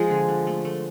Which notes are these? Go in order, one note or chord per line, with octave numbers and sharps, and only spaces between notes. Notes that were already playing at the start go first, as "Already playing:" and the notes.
Already playing: F3 G#3 G#4
D3
D3
A3
A3